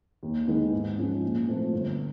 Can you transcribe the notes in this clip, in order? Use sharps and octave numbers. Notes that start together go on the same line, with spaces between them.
D#2
D#3 G#3 B3
G#2
F3 G#3 C#4
A#1
A#2 F3 A3 C4
G1